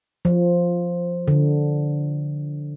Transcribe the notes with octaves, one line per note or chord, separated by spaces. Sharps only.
F3
D3